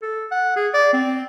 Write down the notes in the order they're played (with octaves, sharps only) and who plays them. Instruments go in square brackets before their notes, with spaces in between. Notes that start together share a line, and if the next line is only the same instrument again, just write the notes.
[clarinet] A4
F#5
G#4
D5
C4